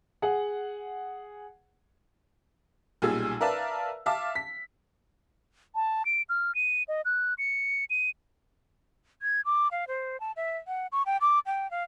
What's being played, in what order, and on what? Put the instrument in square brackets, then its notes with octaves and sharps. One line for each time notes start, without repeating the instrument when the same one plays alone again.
[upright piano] G#4 F#5
[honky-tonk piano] B1 A#2 G3 F4 G#4 E6
A#4 B4 D5 E5 F5 A5
E5 F5 A5 D6
B6
[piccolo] A5
D7
F6
D#7
D#5
F#6
C#7
D#7
[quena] G#6
D6
F5
C5
A5
E5
F#5
C#6
G5
D6
G5
F5